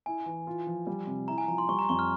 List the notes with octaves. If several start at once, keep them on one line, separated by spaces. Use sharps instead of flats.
E4 G#5
E3
F4
F3
G3
C3
E4 A#5
G#5
F3 A#5
C6
G3 C#6
A#5
F2 C#6
F6